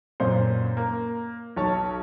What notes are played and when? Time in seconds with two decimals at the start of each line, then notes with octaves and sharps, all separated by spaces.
0.20 F#2 A#2 C5
0.77 A#3
1.56 B1 C#5 A5